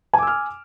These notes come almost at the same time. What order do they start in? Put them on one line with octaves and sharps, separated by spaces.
G#5 D6 E6 F6